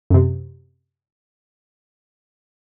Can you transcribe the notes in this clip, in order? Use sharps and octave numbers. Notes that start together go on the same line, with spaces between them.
F#2 C3